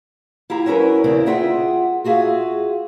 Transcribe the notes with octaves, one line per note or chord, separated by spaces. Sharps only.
E4 F4 G4 A#5
F#3 C#4 E4 A#4 B4
E2 C#3 C4 E4 A#4
F4 G#4 E5 F#5 G5
F4 F#4 G#4 E5 F5